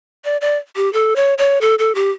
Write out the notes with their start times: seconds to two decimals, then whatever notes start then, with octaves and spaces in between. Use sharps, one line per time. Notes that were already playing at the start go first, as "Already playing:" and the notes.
0.25 D5
0.41 D5
0.76 G4
0.93 A4
1.16 C#5
1.38 C#5
1.61 A4
1.79 A4
1.95 G4